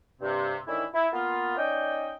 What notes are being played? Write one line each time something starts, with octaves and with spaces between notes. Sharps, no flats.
G2 C3
A2 D#3 E3 D4 E4
E4
A#3 B3 F4
C#4 D#4 D5 D#5 G5